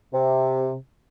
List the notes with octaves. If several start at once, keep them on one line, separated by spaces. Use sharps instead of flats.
C3